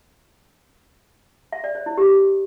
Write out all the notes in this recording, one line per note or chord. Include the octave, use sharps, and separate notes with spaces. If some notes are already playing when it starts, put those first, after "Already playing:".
E5
D5
C#5
E4
G4